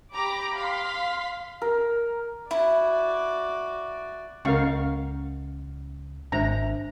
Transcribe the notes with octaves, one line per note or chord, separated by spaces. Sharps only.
G4 A#5 B5 D6
F5 C6 B6
A#4
E4 F#4 D5
C#2 C#4 A#4 D#5 F5 F#5 C#6
G#1 D4 C5 E5 A#5